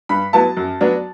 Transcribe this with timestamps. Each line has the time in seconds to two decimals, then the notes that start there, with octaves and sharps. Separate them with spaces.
0.09 G2 B5
0.33 F#3 B3 E4 A5
0.57 F#2
0.81 F#3 B3 D4